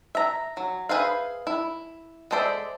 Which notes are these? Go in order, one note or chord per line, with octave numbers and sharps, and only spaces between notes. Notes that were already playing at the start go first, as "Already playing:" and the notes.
E5 A#5
F#3
G#4 B4 C5 E5 F5
E4
G#3 A4 C5 D5 E5